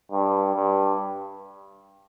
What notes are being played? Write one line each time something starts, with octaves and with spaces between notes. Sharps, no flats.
G2
G2